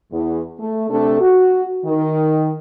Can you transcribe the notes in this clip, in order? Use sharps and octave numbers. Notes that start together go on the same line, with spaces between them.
E2
A3
C3 A3 D4 A4
F#4
D#3